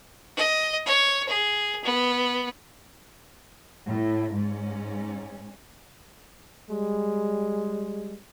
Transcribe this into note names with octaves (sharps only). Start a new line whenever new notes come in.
D#5
C#5
G#4
B3
A2
G#2 C#4
G3 G#3